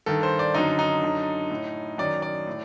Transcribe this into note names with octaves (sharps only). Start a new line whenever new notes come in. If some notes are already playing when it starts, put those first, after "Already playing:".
G2 D#3 A4
C5
D5
F#2 D3 D#4
D#4
F#2 D3
A2
F#2 D#3 D5
D5
A2